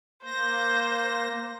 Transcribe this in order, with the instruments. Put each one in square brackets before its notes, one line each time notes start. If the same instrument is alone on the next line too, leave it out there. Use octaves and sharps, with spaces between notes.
[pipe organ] A#3 A#6 [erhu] C5